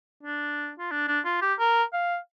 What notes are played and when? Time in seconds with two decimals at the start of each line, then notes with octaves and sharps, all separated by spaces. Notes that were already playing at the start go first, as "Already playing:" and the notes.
0.23 D4
0.79 F4
0.91 D4
1.08 D4
1.25 F4
1.42 G4
1.59 A#4
1.93 F5